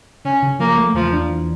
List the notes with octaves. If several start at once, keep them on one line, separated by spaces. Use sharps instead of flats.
C#3 C#4
C#3
F3 A#3
A3
E2 F3
D4
E3